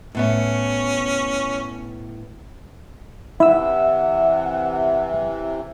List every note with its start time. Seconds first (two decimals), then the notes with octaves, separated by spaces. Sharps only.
0.15 A2 B3 C#4 E5
3.40 C3 E3 E4 E5 F#5 E6